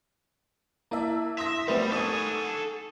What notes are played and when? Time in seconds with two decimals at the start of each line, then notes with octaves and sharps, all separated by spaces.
0.91 A#3 E4 E5 A5 A#5
1.38 E5 C6 D#6 A#6
1.68 G3 A3 B3 C4 A#4 B4
1.92 D#4 A4 G#5 C#6 D#6